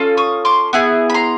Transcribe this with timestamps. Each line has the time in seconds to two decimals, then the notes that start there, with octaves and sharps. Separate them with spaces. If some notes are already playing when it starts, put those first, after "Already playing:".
Already playing: C#4 F4 A4
0.17 C#6 D#6
0.45 C6 D6
0.73 B3 E4 G#4
1.10 B5
1.14 A#5 C6